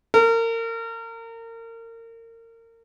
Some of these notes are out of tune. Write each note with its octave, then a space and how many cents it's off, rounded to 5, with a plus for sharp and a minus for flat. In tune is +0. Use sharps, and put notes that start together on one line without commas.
A#4 -30